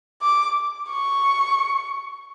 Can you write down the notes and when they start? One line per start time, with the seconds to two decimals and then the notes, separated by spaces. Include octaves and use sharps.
0.22 D6
0.90 C#6